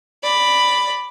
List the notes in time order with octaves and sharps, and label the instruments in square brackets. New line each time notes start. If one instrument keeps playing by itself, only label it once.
[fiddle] D5 B5